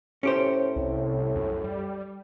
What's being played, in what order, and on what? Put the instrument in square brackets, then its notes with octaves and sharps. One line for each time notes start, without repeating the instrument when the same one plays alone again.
[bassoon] A2 [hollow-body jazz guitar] C#4 G4 C5
[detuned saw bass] C2
F#2
G3